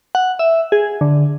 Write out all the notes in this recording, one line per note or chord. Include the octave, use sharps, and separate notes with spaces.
F#5
E5
G#4
D3